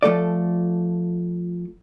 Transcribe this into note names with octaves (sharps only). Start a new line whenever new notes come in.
F3 A3 A4 D5